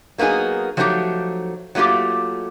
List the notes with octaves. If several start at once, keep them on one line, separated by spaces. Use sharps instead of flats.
F#3 A#3 B3 D#4 G#4
F3 F#3 A3 D#4 F4 G4
F#3 A3 A#3 F4 G4